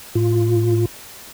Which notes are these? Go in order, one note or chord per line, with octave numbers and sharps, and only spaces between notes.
A2 F4